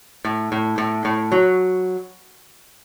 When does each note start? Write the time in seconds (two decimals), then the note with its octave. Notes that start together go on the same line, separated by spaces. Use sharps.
0.24 A2
0.52 A2
0.78 A2
1.05 A2
1.32 F#3